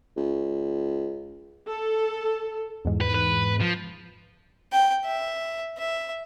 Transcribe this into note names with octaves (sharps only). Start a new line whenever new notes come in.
C#2
A4
E2 G#2
B4
B4
F3
G5
E5
E5